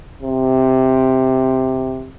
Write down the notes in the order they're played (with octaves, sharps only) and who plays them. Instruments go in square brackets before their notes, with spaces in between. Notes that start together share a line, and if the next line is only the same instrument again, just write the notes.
[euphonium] C3